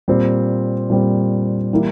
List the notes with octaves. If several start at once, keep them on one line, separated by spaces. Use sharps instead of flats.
A#2 G3 C4
A#2 G3 C4
E3 G3 A#3 E4